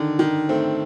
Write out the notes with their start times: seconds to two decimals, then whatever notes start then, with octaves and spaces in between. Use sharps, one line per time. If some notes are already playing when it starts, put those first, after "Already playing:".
Already playing: D3 D#3
0.19 D#3
0.49 A3 C4